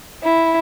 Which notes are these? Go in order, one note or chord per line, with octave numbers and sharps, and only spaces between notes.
E4